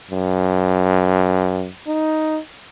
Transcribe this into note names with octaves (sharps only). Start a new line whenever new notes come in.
F#2
D#4